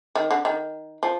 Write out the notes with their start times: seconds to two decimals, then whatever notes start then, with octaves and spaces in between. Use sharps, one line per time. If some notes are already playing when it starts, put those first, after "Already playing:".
0.15 D#3
0.31 D3
0.45 D#3
1.03 F3